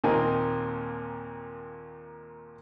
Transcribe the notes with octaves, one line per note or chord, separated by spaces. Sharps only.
D#2 A#2 A#3 C4 D#4 G#5